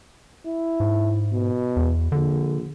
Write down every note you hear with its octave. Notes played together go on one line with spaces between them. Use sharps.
E4
G#2
B2
E2
A#1 D3